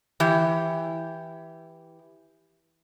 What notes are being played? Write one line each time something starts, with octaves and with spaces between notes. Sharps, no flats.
E3 G4